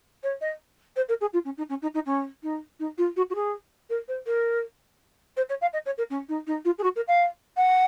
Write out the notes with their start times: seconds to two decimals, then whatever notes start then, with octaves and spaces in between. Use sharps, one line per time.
0.23 C#5
0.41 D#5
0.96 C5
1.08 A#4
1.20 G#4
1.33 F4
1.44 C#4
1.57 D#4
1.69 C#4
1.82 D#4
1.94 D#4
2.05 C#4
2.43 D#4
2.79 D#4
2.97 F4
3.16 F#4
3.30 F#4
3.35 G#4
3.89 A#4
4.08 C5
4.26 A#4
5.36 C5
5.49 C#5
5.61 F5
5.73 D#5
5.85 C#5
5.97 A#4
6.10 C#4
6.28 D#4
6.46 D#4
6.64 F4
6.78 G#4
6.83 F#4
6.95 A#4
7.07 F5
7.57 F#5